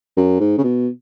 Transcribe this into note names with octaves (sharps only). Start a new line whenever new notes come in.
F#2
G#2
C#3
B2